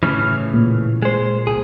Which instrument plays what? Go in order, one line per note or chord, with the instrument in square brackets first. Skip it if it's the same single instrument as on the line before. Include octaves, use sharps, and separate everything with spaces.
[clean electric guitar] A2 C#3 E3 [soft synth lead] F6
[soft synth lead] A#2
[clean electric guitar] G#3 C5
C2 G#4